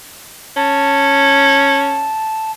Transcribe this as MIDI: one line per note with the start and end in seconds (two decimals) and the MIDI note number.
0.56 2.10 61
0.56 2.51 81